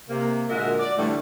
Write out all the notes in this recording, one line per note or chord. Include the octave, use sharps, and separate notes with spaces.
C3 A#3
A#2 D3 G#3 F#4 A#4 E5
D5
A2 D3 E3 G3 A3